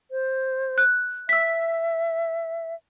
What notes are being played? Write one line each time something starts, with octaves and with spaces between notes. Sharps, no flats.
C5
F#6
E5 E6 B6